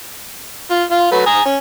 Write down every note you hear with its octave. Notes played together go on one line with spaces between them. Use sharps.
F4
F4 F5
F#3 A3 B4
G#5 A#5 D#6
C#4